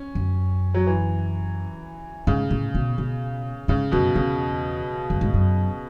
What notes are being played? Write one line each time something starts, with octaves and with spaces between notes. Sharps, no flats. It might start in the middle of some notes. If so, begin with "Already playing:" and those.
Already playing: C#4
F#2
F#3
E3
G#2 C#3
A2
B2
B2
G#2 C#3
F#2 B2
E2 C#3
F#2
G#2
F#2